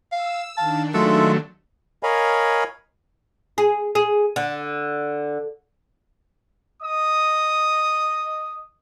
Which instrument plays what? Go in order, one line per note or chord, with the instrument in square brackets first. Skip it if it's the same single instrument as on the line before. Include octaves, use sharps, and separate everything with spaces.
[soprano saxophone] F5 [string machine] E6
[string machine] D#3 D4 [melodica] F5 [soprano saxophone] A5
[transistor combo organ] F#3 A3 [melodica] G#3 F4 E5 [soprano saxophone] A4
[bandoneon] A#4 C#5 D#5 F5 G#5 B5
[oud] G#4
G#4
D3
[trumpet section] D#5 D#6